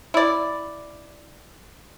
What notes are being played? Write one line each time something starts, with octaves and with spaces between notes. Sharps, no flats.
E4 D5